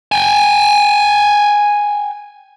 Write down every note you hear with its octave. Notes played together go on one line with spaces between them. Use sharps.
G5 G#5